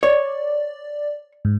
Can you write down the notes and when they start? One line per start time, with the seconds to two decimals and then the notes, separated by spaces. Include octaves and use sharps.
0.03 C#5 D5
1.45 G#2